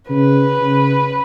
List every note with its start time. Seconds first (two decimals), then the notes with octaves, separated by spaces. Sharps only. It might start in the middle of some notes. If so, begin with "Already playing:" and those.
0.09 C#3 B4
0.60 C#3